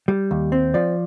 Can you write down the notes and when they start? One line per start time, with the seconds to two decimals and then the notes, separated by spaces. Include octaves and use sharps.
0.08 G3
0.31 D#2
0.52 C4
0.74 F3 D5